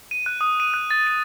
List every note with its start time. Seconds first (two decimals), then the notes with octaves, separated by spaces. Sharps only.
0.11 D#7
0.26 F#6
0.41 D#6
0.60 D#7
0.74 F#6
0.91 A6
1.07 D#7